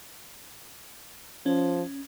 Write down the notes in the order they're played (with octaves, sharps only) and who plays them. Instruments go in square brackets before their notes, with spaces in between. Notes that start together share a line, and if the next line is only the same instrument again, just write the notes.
[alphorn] F3 [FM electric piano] C#4